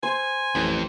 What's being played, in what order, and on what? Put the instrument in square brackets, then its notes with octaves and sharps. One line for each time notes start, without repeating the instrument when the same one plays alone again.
[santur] C5 [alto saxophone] G#5
[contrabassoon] A1 [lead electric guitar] F2